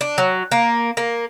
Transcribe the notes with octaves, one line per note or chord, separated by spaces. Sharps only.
D4
F#3
A#3
A#3